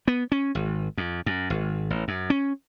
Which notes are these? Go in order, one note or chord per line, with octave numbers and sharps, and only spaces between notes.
B3
C#4
G#1
F2
F#2
G#1
A1
F#2
C#4